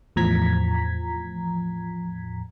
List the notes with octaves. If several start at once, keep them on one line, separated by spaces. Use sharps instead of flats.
E2 A2 F3 A#5 G#6 B6